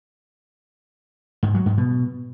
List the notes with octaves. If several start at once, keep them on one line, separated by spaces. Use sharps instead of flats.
G#2
F#3
G#2
B2